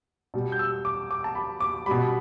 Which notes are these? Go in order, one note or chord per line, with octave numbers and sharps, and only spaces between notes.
B2 G3
G6
E6
D6
D6
A5
B5
D6
B2 G3 B5